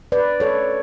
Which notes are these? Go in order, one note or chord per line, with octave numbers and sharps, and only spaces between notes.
B4 D5
A4 C#5